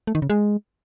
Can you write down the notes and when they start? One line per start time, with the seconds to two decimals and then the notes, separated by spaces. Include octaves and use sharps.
0.07 A3
0.15 D#3
0.22 C#3
0.30 G#3